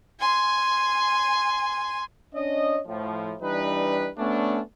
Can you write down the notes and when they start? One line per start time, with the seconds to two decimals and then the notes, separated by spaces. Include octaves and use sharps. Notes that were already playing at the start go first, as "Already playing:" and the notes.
0.19 G#5 C6
2.35 C#4 D4 C#5 D#5
2.87 A2 F3
3.42 E3 G3 D4 D#4 B4
4.18 D2 A3 B3 C#4 D4